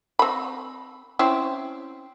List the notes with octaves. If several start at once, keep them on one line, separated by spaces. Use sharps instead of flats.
C4 B5
C4 C#4 E4